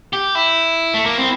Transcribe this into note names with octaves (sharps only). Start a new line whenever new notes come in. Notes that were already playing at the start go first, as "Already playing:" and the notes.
G4
E4
A3
A#3
C4